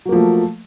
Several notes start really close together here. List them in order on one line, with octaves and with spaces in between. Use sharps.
F#3 A#3 F3 A3